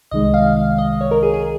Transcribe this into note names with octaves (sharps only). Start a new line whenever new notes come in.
C2 C3 D#3 G#3 D#5
F5
F5
D#5
C#5
A#4
G#4
G#4